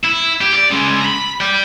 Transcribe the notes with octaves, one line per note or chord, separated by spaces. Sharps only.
E4
G4
D5
C#3 G#3
A#5 B5
D5 G5